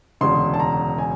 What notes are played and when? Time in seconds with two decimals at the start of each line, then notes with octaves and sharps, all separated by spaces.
0.21 E1 D2 C#3 C6
0.54 A5
0.60 A#5
0.98 G#5